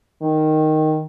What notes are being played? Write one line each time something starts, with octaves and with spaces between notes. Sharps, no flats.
D#3